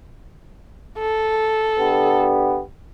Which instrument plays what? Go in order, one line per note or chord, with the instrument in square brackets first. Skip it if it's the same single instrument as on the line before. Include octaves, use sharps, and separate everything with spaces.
[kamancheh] A4
[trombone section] D3 B3 G4